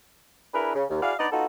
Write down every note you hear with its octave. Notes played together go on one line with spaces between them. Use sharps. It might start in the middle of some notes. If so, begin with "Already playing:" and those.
D4 E4 G#4 A#4 B4
C#3
D#2
E4 F#4 G#4 D5 F5
B3 D4 D#4 B4 D5 D#5
B3 D#4 F4 F#4 A4